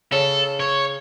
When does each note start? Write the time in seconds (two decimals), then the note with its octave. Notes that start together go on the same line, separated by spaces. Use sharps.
0.12 C#3 A4
0.60 C#5